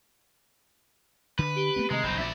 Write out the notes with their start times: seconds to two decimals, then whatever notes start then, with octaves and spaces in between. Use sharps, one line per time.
1.39 D3 B4
1.56 G4 D7 G7
1.76 A3 B3 C4
1.90 C3 D#3 G#3 A3 D#5 A#5
2.03 F#1 B1 C4 D#4 B5
2.18 A#1 D5 E5